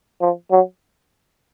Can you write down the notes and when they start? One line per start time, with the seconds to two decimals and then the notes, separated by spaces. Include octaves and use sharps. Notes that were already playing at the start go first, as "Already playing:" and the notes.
0.21 F3
0.51 F#3